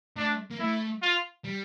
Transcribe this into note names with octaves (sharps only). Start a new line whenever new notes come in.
A3 D4
A#3
A3 E4
F4
G3